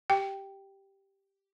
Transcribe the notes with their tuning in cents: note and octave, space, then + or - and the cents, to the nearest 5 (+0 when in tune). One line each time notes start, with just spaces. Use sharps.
G4 -5 G5 +0